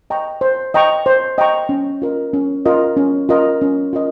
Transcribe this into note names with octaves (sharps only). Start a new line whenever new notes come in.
D#5 G5 A#5 C#6
C5
D#5 G5 A#5 C#6
C5
D#5 G5 A#5 C#6
C#4
F4 A#4 D#5
C#4
F4 A#4 D#5
C#4
F4 A#4 D#5
C#4
F4 A#4 D#5